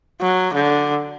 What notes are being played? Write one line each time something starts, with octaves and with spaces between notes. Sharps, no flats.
F#3
D3